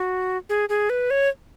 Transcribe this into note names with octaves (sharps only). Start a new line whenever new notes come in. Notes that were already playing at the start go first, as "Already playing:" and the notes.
Already playing: F#4
G#4
G#4
B4
C#5